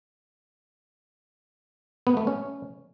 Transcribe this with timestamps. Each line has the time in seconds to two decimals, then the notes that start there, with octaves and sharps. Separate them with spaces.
2.07 B3
2.17 A3
2.27 C#4